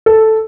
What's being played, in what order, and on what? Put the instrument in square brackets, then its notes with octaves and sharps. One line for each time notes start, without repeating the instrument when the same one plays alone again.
[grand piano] A4